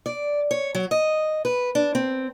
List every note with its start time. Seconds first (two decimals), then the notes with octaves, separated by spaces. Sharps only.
0.06 D5
0.51 C#5
0.75 F#3
0.91 D#5
1.45 B4
1.75 D4
1.95 C4